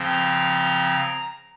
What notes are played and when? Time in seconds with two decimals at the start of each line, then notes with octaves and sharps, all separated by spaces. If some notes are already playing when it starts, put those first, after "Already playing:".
Already playing: C#3 F3 C4
0.09 A#5